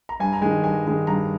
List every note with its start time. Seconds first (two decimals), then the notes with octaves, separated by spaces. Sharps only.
0.09 A#5
0.20 G2 G#5
0.33 A#5
0.42 D#3 G#3 G#5
0.63 G2 G#5
0.86 D#3 G#3
1.07 G2 A#5